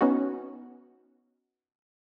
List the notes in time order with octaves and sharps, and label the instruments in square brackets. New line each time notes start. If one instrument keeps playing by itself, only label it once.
[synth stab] B3 C#4 D#4 F#4